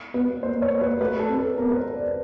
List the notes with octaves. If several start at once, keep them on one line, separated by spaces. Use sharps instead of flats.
B3 B4
A#3 C5
C#5
A#3
B4
A3 B4
A4
C4
A4
B3 A#4
B4
C5
D5